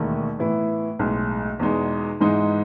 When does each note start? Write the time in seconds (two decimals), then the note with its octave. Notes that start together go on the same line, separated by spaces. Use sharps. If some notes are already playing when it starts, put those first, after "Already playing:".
Already playing: E1 D#2 D#3 A3
0.39 A2 E3 B3 E4
0.99 B1 A2 G#3
1.60 E2 B2 G#3 D#4
2.21 G#2 E3 G#3 B3 D#4